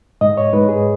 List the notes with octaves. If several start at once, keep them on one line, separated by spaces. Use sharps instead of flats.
G#2 D#5
C#5
G#2 B4
G#4